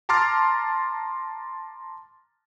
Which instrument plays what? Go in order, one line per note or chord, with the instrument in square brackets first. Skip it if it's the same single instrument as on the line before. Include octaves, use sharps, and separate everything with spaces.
[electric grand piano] A5 A#5 C6 D6 F6 A6